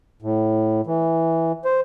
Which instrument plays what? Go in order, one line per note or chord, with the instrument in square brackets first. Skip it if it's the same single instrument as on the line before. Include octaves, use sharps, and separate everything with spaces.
[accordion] A2
E3
C5